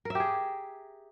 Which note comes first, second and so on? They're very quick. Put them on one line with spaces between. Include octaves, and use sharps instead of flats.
A#4 E5 G4 G#4